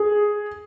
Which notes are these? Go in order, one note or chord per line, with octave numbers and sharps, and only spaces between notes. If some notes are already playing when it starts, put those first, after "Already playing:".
Already playing: G#4